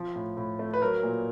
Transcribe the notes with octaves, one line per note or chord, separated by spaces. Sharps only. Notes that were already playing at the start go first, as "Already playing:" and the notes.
Already playing: F3
A2
A2
A3
B4
F#3 A#4
A#2